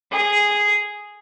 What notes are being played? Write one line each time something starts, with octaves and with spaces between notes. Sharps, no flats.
G#4